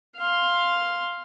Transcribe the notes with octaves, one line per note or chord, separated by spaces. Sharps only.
F5 C6